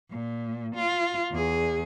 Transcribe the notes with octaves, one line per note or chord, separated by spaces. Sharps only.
A#2
F4
E2 G#4